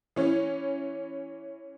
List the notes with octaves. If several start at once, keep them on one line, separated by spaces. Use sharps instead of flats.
E3 C#4